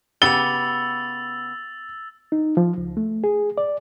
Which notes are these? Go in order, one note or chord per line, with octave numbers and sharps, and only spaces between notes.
C#3 B3 G4 E6 A6 F7 G7
D#4
F3
C#2
A3
G#4
D5